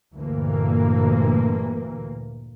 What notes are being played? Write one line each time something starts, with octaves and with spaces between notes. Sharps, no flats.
D2 G2 A#2 E3 A#3